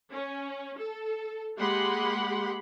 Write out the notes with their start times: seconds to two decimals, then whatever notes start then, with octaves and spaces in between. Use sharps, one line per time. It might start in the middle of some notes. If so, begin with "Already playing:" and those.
0.12 C#4
0.78 A4
1.58 G#3 A#3 G4 F#5 B5 C6